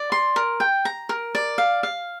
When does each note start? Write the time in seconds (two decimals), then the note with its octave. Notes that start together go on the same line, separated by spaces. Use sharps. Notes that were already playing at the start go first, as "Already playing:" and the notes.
Already playing: D5
0.12 C6
0.36 A#4
0.60 G5
0.85 A#5
1.09 A#4
1.35 D5
1.58 F5
1.83 F5